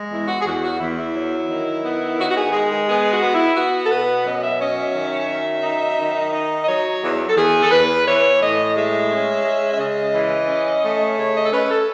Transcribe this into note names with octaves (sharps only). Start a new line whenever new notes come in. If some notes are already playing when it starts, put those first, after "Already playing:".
Already playing: G#3
E2 E4
F#4
G#4
E2 F#4
F#4
E2 E4
E4
F#3
D#3
B3
D#3 F#4
F#4
G#4
G#3 G#4
G#4
B3 G#4
F#4
B3
E4
B3 F#4
A4
B2 B4
F#2 D#5
E5
C#4 D#5
E5
D#3
F#2
D#4
D#3
D#4 D#5
D#5
F#3 C#5
E2
A4
E2 G#4
A4
E2 B4
E3 C#5
A2 D#5
G#3 E5
C#4
G#3
E5
C#3 D#5
E3
C#4
A3
C#3 C#5
D#5
A4
C#4 B4
A4